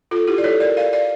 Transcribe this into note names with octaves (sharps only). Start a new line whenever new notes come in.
F4 A4
E4 G4
D5
A4 C#5
A#4 D5
D5 F5
D5 F5